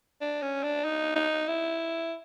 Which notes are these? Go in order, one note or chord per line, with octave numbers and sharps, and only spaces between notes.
D4
C#4
D4
D#4
D#4
E4